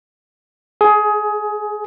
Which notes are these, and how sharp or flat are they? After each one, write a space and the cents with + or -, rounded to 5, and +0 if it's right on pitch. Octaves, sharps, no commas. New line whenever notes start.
G#4 +20